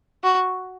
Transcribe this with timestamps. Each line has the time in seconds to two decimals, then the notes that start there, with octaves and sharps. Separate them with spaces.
0.24 F#4